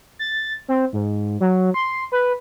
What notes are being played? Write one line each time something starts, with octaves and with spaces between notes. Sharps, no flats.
A6
C4
G#2
F#3
C6
B4